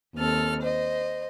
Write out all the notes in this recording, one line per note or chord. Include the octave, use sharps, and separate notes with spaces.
D#2 C4 A4 F6
C5 D#5